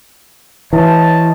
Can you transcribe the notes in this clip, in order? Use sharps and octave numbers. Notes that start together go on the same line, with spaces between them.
E3 C#5 D#5 A5